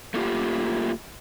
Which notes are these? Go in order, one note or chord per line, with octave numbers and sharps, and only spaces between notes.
A3 A#3 F4 G4